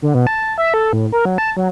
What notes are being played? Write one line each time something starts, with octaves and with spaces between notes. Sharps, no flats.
D3
B2
A5
E5
A4
A2
A#4
F#3
A5
F#3